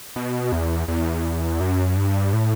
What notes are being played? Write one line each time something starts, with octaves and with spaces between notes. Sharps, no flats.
B2
E2
E2
F#2
G2
A2